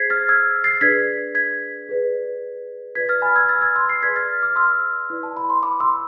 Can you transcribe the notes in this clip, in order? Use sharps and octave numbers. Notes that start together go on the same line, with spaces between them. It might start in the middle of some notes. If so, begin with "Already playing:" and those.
Already playing: G#4 C5 G#6 A6 B6 C7
F6 A6
E6 G#6
A6 C7
D4 G#4 B4 D5 G#6 B6
G#6 B6
G#4 B4 D5
F4 B4 D5 G#6 B6
F6 A6
G#5 B5
E6 G#6
F6 A6
E6 G#6
C6 E6
A6 C7
G#4 B4 D5 G#6 B6
F6 A6
D6 F6
C6 E6
E4 B4 D5
A5
B5
C6
B5 D6
C6 E6